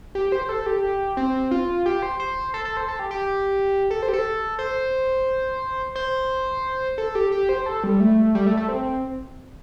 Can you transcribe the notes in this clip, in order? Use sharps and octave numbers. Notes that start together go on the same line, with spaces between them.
G4
C5
A4
G4
C4
F4
G4
C5
C5
A4
A4
C5
A4
G4
G4
A4
C5
G4
A4
C5
C5
A4
G4
G4
C5
A4
G3
A3
G3
A3
A3
C4